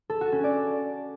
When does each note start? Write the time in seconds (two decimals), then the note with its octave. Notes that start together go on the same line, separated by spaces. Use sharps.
0.10 A4
0.21 F#4
0.32 C#4
0.44 D5